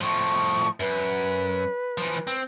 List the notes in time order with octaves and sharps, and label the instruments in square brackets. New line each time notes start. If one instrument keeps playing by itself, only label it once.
[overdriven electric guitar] A2 F3 [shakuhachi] C#6
[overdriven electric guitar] F#2 [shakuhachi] B4
[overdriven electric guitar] E3 F3
C4